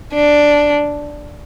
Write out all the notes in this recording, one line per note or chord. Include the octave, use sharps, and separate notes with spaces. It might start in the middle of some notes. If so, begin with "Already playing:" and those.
D4